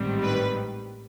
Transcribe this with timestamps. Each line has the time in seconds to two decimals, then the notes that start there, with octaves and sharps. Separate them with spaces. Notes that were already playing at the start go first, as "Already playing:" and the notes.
Already playing: A1 G#2 D#3 G3 C4
0.22 B4